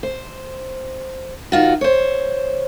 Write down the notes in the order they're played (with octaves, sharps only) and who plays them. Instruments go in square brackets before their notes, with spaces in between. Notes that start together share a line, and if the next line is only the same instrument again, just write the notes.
[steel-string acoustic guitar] C5
D#3 F4 F#4
C5 C#5